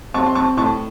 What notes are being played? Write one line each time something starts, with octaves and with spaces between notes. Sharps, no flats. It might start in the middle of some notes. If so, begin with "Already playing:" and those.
C4 A5 C#6
C6
C4 A5 C#6
A2 A5 C#6